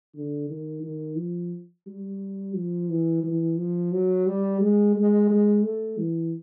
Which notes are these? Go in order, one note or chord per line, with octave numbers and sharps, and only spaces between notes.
D3
D#3
D#3
F3
G3
F3
E3
E3
F3
F#3
G3
G#3
G#3
G#3
A3
E3